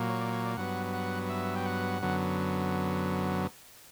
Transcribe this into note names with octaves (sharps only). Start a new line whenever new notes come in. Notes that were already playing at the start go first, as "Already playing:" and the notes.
Already playing: A#2 F#3 A#3
C#5
D5
C#5
D5
G2 F#3 B3 F#5
F#5
E5
G5
F#5
F#2 D3 F#3 B3